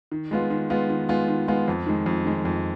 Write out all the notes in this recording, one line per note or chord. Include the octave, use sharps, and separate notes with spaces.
D#3
G#3 B3 F4
D#3
G#3 B3 F4
D#3
G#3 B3 F4
D#3
G#3 B3 F4
F2
D#3 G#3
F2
D#3 G#3
F2